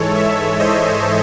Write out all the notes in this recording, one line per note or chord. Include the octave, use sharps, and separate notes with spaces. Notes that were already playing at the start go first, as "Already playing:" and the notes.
Already playing: G#2 E3 G#3 A4 C#5
C#5 E5
C5 D#5